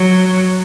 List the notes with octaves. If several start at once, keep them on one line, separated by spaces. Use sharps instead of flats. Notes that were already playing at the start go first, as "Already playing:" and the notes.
Already playing: F#3